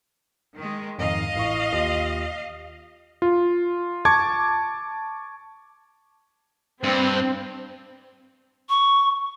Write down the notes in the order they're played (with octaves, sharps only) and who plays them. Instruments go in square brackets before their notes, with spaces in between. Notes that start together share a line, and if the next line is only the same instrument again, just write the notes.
[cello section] D#3 G#3
[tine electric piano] F2 G#2 D#3 [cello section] D#5 F5
[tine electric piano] A1 E4 C#6
D#2 F4 G4
[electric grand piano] F4
A5 C#6 D6 G#6
[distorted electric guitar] G2 [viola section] C4
[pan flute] C#6